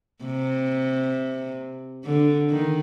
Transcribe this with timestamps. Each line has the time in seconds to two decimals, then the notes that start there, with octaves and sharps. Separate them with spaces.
0.24 C3
2.04 D3
2.50 D#3